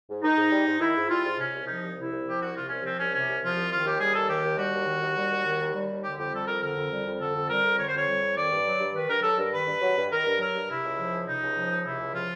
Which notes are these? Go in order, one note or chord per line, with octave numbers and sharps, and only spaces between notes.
G#2
D#3 D#4
G#2
G3
G#2
D#3 E4
G#2
G3 F4
G#2
C3 C#4
C2
F3 D#4
C2
C3 E4
C2
F3 G4
C2 F#4
C3 F4
C2 C#4
F3 C4
C2 C#4
C3 C#4
C2
F3 F4
C2
D#3 F4
D#2 G4
G3 G#4
D#2 A4
D#3 G4
D#2
G3 F#4
D#2
D#3
D#2
G3
D#2
D#3
D#2
G3
D#2
D3 G4
F2 G4
G3 A4
F2 A#4
D3 A#4
F2
G3
F2
D3 A4
F2
G3 A#4
F2
D3 C#5
C5
F2 C#5
G3
F2
D#3 D5
G2
F#3
G2
D#3 B4
G2 A#4
F#3 A4
G2 A#4
D#3 B4
G2
F#3
G2
D#3 A#4
G2
F#3 A#4
G2
C3 E4
C#2
F3
C#2
C3 D#4
C#2
F3
C#2
C3 E4
C#2
F3 F4